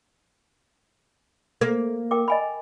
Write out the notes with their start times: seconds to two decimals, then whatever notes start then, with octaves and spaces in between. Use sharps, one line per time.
1.61 A#3
2.11 A#4 G5 D6
2.28 D#5 G#5 B5